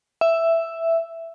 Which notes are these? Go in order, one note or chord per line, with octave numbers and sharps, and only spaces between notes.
E5